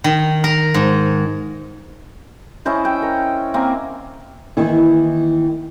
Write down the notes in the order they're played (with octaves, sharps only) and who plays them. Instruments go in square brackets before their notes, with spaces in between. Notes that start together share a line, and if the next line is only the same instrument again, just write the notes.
[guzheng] D#3
A#4
G#2
[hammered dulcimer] C#4 E4 C5 D#5
G5
A#4
A#3 C4 A#4 G#5
[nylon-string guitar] D#3 E3 A#3 E4